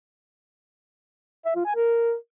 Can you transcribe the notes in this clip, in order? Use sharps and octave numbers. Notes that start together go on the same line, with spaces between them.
E5
F4
G#5
A#4